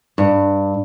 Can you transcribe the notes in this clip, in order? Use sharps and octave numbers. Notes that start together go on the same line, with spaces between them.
G2